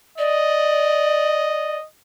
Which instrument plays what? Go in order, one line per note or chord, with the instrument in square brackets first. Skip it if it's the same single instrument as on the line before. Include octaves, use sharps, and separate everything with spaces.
[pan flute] D5 [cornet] D#5